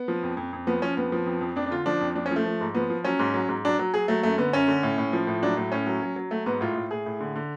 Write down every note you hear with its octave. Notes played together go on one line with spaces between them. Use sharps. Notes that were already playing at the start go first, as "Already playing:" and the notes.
Already playing: B3
F3
F2
F2
F2
F3 B3
F3 C#4
F2 B3
F3
F2
F2
F2 D4
D4
D3 F4
F3 D4
F2
F3 D4
C#4
F3
A3
F3
G#2
F3 B3
F3
F#3 C#4
G#2
F#3
G#2
F#3 D4
F#3
F#3 G#4
F#3 A3
F#2 A3
D3 B3
F#2 C#4
D3
A2
A2
F3
A2
F#3 D4
A2
A2 C#4
F#3
F#3
F#3
F#3 A3
G#2 B3
A2 F4
A2
A2 G#4
A2
D3
D3